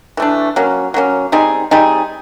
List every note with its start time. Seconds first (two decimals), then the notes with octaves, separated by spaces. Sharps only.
0.17 E3 A3 D4
0.56 F#3 A#3 C#4
0.94 F#3 A#3 C#4
1.32 G3 C4 D#4 G#4
1.71 G3 C4 D#4 G#4